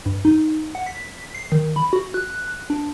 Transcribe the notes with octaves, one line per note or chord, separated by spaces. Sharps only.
G2
D#4
F#5
B6
C7
D#3
B5
F#4
F#6
D4